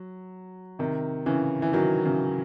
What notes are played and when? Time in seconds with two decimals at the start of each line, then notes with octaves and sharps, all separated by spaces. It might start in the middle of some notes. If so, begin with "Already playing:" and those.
Already playing: F#3
0.79 C3 D#3
1.26 C#3 E3
1.62 E3
1.73 D#3 F#3
2.05 C#3 E3